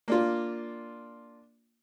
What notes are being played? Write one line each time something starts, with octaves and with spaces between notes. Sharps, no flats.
A#3 D4 F4